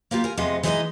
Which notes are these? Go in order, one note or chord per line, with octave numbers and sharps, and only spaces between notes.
A#3 B3 F4 G4
A#4 G#5
F2 C3 G#3 B3 D#5
E3 G#3 D#4 A#4 B4 D#5